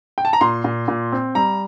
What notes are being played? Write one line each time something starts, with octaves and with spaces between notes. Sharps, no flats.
G5
A5
A#5
A#2 C6
A#2
A#2
C4
G3 A#5